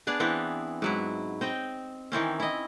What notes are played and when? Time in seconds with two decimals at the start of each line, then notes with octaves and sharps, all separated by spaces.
0.07 B3 D4 G#4 D5
0.20 E3 B3 C4
0.82 G#2 F#3 E4
1.41 C4 D#5 G5
2.12 D#3 E3 C4 C#4
2.40 E4 D#5